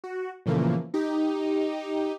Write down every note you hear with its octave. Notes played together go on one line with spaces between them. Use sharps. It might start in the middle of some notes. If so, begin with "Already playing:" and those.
F#4
A#2 C#3 E3 F3 A3 A#3
D#4 G4